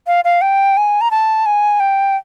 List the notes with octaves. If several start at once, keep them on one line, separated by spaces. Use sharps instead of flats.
F5
F5
G5
G#5
A#5
A5
G#5
G5